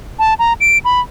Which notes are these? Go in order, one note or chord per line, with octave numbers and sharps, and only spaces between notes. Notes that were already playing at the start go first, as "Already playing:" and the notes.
A5
A#5
D7
B5